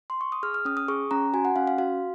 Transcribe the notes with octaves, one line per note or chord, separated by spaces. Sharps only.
C6
C#6
D#6
G#4 F6
F6
C#4 D#6
D#6
G#4 C#6
C#4 A#5
F#4 G#5
F#5
C#4 F5
F5
F#4 F5